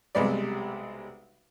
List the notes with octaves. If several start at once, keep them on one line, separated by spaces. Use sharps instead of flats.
B1 C3 G3 G#3 B4 D5